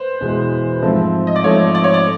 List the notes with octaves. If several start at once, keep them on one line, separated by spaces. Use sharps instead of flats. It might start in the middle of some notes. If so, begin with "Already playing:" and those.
Already playing: B4 C5
E2 B2 G#3
G#2 F3 A3 C4
D#5
D5
G#2 F3 A3 C4 C#5
D5
C#5
D5